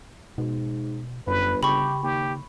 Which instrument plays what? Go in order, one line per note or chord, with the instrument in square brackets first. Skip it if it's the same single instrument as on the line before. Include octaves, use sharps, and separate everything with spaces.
[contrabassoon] G#2 [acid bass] B2
[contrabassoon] G1 [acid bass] F#2 [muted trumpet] B4
[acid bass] C#3 [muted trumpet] G4 [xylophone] B5 C#6
[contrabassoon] D#2 [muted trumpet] G4